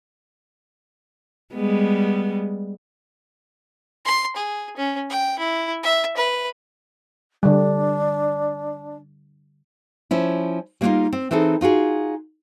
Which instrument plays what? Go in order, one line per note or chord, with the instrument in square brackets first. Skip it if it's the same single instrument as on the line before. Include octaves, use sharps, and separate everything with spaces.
[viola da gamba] G3 G#3 B3
[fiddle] C6
G#4
C#4
G5
E4
E5
B4
[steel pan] D3 G3 [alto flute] D4
[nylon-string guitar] F3 C#4 E4
G3 A#3 C4 D4 D#4 F4
C4
E3 C4 D#4 G#4 A4
D#4 F4 F#4 G#4